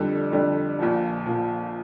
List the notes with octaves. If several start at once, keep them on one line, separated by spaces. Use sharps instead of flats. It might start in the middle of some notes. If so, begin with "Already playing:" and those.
Already playing: F2 D3 G3
F2 D3 G3
A#1 A#2 F3
A#2 F3